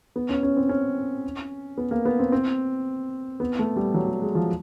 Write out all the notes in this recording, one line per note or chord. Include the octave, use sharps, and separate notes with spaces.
B3
C#4
C#4
C4
C#4
B3
A#3
B3
C4
C4
B3
A3
G3
F#3
G3
G#3
F3